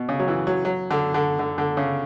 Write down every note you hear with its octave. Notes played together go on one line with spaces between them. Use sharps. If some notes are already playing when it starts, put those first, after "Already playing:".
Already playing: B2
C#3
F#3
E3
F#3
F#3
D3
D3
D3
D3
C#3